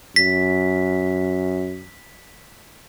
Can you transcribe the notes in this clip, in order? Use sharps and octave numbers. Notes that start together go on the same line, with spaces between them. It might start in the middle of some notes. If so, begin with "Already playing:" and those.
F#2 B6